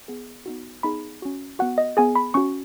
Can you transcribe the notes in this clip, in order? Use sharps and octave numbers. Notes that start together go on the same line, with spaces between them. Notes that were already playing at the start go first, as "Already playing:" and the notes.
B3 G#4
B3 D#4 F#4
B3 D#4 G#4 B5
C#4 F#4
B3 F#4 F#5
D#5
B3 G#4 G#5
B5
C#4 F#4 C#6